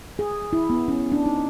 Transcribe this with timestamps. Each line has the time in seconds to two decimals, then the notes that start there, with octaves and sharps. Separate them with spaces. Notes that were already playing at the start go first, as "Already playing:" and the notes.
0.19 G#4
0.53 E4
0.70 B3
0.88 C#4
1.12 D4
1.26 D#4